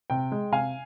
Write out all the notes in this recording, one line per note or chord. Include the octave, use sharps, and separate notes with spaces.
C3 G5
G#3
C3 F5 G#5